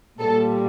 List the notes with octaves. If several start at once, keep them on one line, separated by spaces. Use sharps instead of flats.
A#2 G3 A4